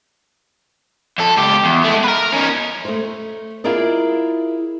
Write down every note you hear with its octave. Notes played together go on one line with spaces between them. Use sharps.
F2 A4
C#2 G4
E2
G#3 A3
A#4 B4
C#4 D#4
A3 C5
E4 F4 G#4 A#4 D5 D#5